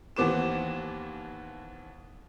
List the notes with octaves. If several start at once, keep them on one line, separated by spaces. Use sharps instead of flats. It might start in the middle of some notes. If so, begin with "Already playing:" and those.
D#2 E3 B3 C5 D6 E7